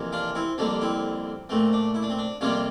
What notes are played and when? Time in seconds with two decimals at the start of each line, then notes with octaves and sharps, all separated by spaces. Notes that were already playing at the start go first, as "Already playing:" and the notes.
Already playing: F2 C3 E3 A#3
0.12 D4 F4
0.35 C4 E4
0.58 F2 D3 G3 A#3 D4
0.81 C4 E4
1.49 A#2 A3 C4
1.73 D4
1.95 E4
2.03 D4
2.10 C4
2.18 D4
2.41 F2 C3 G3 A#3 D4 F4